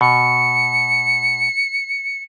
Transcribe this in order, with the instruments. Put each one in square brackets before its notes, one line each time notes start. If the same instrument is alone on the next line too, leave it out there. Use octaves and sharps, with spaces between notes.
[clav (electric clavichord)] B2 [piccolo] C#7